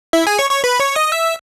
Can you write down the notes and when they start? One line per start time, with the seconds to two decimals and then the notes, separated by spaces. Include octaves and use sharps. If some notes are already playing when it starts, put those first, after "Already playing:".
0.13 E4 E5
0.27 G#4 G#5
0.38 C#5 C#6
0.50 C#5 C#6
0.64 B4 B5
0.80 C#5 C#6
0.96 D#5 D#6
1.12 E5 E6